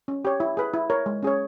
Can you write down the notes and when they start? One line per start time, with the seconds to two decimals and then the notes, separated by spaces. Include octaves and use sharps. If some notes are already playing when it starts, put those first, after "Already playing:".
0.08 C#4
0.25 G4 C#5
0.40 E4
0.57 G#4 B4
0.74 E4
0.90 A#4 C#5
1.06 G#3
1.23 C#4 G#4 C#5